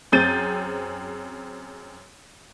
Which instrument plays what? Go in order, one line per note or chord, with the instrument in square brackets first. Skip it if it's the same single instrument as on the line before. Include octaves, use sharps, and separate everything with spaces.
[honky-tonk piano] F#2 C4 G#4 G6 A6 D#7